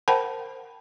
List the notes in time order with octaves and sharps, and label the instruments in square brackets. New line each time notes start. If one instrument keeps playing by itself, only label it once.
[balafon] A#4 C5 F#5 G5 A5 B5